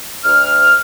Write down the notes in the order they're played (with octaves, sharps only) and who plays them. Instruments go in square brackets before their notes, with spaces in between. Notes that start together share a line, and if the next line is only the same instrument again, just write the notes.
[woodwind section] D2 F6